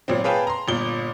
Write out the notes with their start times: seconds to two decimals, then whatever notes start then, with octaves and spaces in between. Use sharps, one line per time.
0.08 G#1 A#2 F#3 C4
0.24 G#4 B4 C#5 F5 G5 A5
0.47 A#5 C6
0.68 G1 A#2 G7